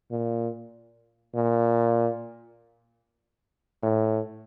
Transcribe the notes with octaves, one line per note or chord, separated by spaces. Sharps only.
A#2
A#2
A2